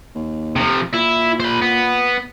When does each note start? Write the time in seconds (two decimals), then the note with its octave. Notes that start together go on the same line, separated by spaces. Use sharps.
0.15 D#2
0.56 C3 F3
0.93 A#2 E4
1.40 C5 B5
1.62 B3